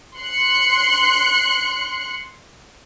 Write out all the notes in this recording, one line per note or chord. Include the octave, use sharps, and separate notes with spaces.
C6 F#6 C#7